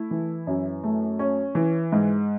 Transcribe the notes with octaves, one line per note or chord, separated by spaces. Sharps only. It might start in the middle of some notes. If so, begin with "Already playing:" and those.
Already playing: A3 E4
E3
F#2
A3
C#4
E3
G#2